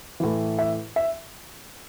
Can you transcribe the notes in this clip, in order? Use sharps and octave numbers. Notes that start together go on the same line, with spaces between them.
A2 E3
E5
E5